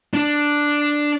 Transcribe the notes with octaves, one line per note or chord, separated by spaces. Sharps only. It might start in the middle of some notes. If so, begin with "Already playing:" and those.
D4